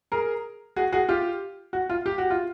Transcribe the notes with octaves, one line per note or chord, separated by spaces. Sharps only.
G#4 A#4
F#4 G#4
F#4 G#4
F4 G4
F#4
F4
G4
F#4
F4